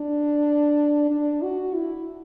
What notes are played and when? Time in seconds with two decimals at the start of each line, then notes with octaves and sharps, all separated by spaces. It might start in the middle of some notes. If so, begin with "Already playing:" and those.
Already playing: D4
1.10 D4
1.42 F#4
1.74 E4